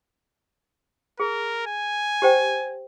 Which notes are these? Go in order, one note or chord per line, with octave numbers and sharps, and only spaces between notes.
G#4 A#4
G#5
G4 C5 G5